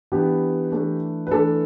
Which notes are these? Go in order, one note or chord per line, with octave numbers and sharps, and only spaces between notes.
E3 B3 D4 G4
E3 A3 D4
B4
E3 A3 D4 A4